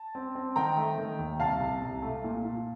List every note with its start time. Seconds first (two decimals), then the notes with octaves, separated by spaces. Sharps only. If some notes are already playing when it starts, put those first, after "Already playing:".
Already playing: A5
0.15 C4
0.35 C4
0.56 D#3 G5 A#5
0.77 A3
0.98 D#3
1.19 D#2
1.40 C2 F5 A5
1.60 C2
1.82 C2
2.02 A3
2.24 A#2
2.45 A#2